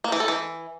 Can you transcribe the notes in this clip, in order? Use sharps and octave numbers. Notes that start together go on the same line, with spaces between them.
A#3
E3
A4
E3